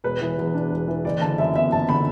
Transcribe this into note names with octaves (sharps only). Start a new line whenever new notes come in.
E1 B4
E3
E2
D4
E1
E3
F#1 D5
D3 A5
F#2 E5
B3 E5
F#1 A5
D3 B5